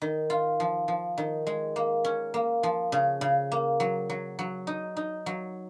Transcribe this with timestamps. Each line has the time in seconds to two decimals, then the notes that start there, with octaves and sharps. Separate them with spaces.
0.02 D#3
0.30 F4
0.60 F3
0.88 F3
1.18 D#3
1.47 G#3
1.76 A#3
2.04 C#4
2.34 A#3
2.63 F3
2.92 C#3
3.21 C#3
3.52 A#3
3.80 F#3
4.10 F#3
4.39 F#3
4.67 D#4
4.97 D#4
5.26 F#3